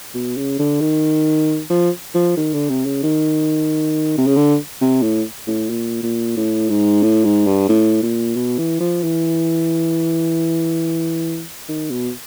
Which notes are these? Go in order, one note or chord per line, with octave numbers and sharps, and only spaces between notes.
B2
C#3
D3
D#3
F3
F3
D#3
D3
C3
C#3
D#3
C3
C#3
D3
C3
A2
A2
A#2
A#2
A2
G#2
A2
G#2
G2
A2
A#2
B2
E3
F3
E3
D#3
B2